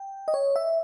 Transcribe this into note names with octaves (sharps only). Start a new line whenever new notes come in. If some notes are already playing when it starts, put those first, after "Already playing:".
Already playing: G5
D#5
C#5
E5